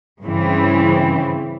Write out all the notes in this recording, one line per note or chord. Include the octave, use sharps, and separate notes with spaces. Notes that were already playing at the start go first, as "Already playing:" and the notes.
G2 C#3 E3 C4